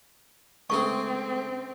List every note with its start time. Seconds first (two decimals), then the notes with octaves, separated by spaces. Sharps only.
0.70 C#2 A3 C4 G#4 C#6